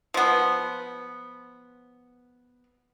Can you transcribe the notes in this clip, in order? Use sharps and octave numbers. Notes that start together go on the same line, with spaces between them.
F3 B3